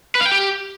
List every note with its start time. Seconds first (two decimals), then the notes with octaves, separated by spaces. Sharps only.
0.15 B4
0.21 F5
0.26 G5
0.32 G4